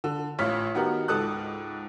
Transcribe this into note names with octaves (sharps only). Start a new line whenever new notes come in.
D3
A1 F4 C#5 F6 B6
D#3 B3 F#4 G4 A#4
C#2 G#2 A4 D#6 F#6